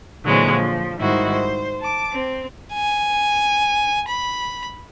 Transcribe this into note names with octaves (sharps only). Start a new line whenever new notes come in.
A#2 D3 E3 F#3 G#3 C4
F3
G#2 D#3 G3 E4 F#4 C5
C5
A5 D6
C4
G#5
B5